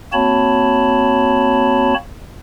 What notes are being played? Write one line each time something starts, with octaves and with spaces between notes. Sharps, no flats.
A#3 C4 F#4 C#5 A5 B5